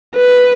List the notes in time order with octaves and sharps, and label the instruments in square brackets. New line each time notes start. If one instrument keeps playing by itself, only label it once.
[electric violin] B4